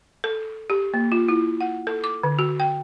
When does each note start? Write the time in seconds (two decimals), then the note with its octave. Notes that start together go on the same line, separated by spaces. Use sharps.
0.24 A4
0.70 G4
0.94 A#3
1.12 F4
1.29 E4
1.61 F#5
1.87 A4
2.04 D6
2.23 D3
2.39 F#4
2.60 G5